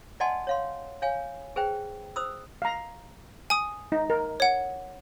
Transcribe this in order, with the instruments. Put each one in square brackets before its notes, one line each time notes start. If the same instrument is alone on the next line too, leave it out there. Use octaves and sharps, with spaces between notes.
[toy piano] D5 D#5 F#5 G#5 A5 C6
C#5 F5 C6
C#5 F5 G#5
G#4 B4 C5 G5
C5 B5 D#6 E6
[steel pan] F5 A#5
[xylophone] G#5 D#6
[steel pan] D#4
A#4
[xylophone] C#5 F#5